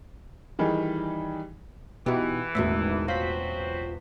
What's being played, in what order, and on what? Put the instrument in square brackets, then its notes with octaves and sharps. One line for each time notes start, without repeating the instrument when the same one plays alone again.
[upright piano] D#3 E3 G3 D#4 G#4
[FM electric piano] B2 D#4 E4 [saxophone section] E3 [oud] F#4 G4
[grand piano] E1 A1 [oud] D2 G#2 D#3 [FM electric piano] E5
[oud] F#3 [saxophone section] C4 F#4 C5 [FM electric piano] F4 B6